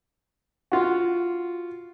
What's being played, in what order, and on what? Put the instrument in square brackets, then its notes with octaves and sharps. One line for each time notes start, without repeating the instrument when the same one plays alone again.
[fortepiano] F4 F#4